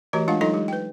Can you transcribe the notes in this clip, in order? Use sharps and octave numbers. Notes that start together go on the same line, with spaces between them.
E3 A3 F#4 G4 C#5 D#5
G#3 D4 F4 F5 F#5
F#3 D#4 F4 A4 D#5 C6
G#3 G4
B4 G5